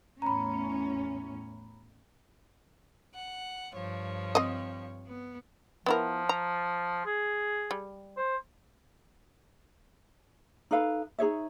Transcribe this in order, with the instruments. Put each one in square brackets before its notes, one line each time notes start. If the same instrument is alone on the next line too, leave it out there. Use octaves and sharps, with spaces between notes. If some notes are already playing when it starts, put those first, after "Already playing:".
[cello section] E2 A2 C#4 [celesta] A#5 B5
[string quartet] F#5
G2 F3 C#5
[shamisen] C4 D#5
[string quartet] B3
[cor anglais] F3 [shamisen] B3 E4 A#4
[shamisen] A#5
[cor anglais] G#4
[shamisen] G3
[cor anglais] C5
[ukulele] D#4 A4 B4 F5
D#4 G#4 C#5 E5